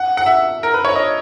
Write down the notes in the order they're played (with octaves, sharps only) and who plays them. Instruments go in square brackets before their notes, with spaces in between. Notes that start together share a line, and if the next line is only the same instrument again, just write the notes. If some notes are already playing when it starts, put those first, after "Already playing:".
Already playing: [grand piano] F#5
F#5
E5
A#4
B4
C#5
D#5